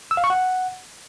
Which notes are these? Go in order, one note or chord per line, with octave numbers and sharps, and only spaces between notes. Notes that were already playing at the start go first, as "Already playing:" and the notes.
E6
F5
C#6
F#5